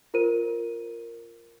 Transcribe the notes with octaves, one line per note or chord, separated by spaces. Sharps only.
F4 A#4 C5 D#7